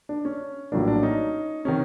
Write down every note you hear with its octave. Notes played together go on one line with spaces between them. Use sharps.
D4
C#4
A#1 A2 F#3 A#3 D4
D4
C#4 D#4
C3 D#3 C#4